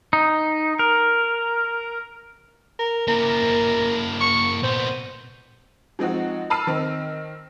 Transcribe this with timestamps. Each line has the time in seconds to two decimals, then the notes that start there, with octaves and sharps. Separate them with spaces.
0.13 D#4
0.79 A#4
2.79 A#4
3.08 A#3 E4 A#4
4.21 C#6
4.63 A#2 B3 C5
5.99 F3 G#3 C4 D#4 F#4
6.50 A5 B5 E6 F6 C7 D#7
6.67 D#3 C4